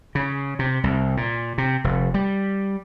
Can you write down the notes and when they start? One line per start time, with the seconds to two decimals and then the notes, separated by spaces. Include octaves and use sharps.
0.15 C#3
0.59 C3
0.84 C2
1.17 A#2
1.58 C3
1.84 F1
2.14 G3